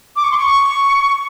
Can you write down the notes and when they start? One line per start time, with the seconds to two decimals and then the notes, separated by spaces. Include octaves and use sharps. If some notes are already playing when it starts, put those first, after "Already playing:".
0.16 D6
0.23 C#6
0.31 C6
0.38 C#6